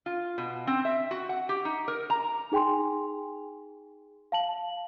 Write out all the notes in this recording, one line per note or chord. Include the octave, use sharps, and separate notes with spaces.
F4
B2
C4
E5
F#4
F#5
G4
D#4
A#4
A#5
D#4 G#4 G5 G#5 C6
F5 A5 F#7